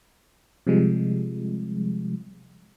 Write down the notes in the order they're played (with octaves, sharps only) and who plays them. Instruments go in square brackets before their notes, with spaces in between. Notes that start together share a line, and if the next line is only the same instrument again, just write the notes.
[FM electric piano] C3 F3 G3 G#3